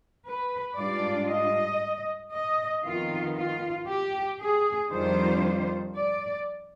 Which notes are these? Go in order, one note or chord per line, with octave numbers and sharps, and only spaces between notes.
B4
G#2 G3 D4 F4 D5
D#5
D#5
F2 D#3 B3 F4
F4
G4
G#4
F2 D#3 G3 D4 F4 C5
D5